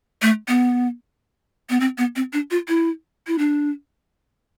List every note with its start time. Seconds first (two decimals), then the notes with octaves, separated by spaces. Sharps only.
0.22 A3
0.48 B3
1.70 B3
1.80 C4
1.98 B3
2.16 C4
2.33 D4
2.51 F4
2.68 E4
3.27 E4
3.38 D4